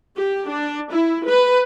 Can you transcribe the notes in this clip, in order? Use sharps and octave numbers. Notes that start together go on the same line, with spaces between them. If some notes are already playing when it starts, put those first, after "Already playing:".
G4
D4
E4
B4